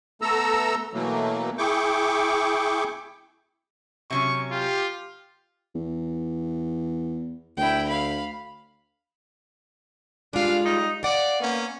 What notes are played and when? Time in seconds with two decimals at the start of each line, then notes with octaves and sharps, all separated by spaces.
0.22 A3 B3 A4 A#5 E6
0.94 B2 E3 F#3 A3 A#3
1.58 E4 G#4 G5 C#6 D6
4.10 C3 F#3 C#4 C#6
4.51 F4 G4
5.75 E2
7.57 D2 E4 G5
7.88 F5 B5
10.33 G3 G#3 D4 F4 F5
10.64 G3 D#4
11.03 D5 F5 F#5
11.40 A#3 B3 C#4